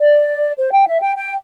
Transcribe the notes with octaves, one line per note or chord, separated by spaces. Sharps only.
D5
C5
G5
E5
G5
G5